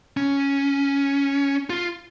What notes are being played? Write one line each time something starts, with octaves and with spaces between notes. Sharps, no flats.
C#4
F4